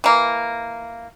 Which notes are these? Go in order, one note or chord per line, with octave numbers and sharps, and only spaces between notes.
E3 A#3